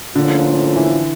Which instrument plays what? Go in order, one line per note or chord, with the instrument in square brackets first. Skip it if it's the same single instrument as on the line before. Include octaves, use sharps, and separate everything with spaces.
[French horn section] A2 F3 A#3 C#4 F4 [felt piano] D3
[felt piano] E3